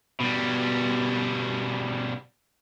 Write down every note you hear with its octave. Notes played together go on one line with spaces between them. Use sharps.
B2 G3